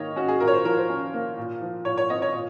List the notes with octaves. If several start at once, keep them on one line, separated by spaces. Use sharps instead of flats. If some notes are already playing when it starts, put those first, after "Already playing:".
Already playing: D#3 A#3 C#5 D#5
C#4 F#4
G#4
A#2 A#4
C#5
C5
F3 A#4
C5
C#4
A#3
A#2
F3
A#2 C#5
C#5
C4 D#5
C#5
A#2